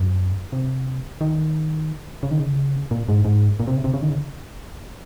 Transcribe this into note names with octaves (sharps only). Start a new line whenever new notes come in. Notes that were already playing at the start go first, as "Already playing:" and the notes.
Already playing: F#2
C3
D#3
C#3
D#3
C#3
A#2
G#2
G#2
A#2
C3
C#3
C3
C#3
D#3
C#3